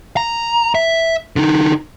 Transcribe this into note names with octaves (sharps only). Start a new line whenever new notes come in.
A#5
E5
D3 D#4